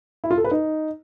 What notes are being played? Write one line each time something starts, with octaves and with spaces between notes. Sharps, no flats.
E4
F4
A4
B4
D#4